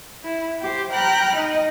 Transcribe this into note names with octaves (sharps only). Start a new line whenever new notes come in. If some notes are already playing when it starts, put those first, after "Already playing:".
E4
G4 C5
G5 A#5 B5 F6 F#6
D#4 D#5